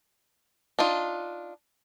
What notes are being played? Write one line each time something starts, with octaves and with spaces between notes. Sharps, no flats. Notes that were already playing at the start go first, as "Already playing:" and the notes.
D4 D#4 F4